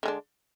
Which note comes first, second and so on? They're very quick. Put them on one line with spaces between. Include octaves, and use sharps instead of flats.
D3 G#3 D4